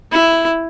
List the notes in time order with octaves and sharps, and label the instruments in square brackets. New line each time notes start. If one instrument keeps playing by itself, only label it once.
[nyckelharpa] E4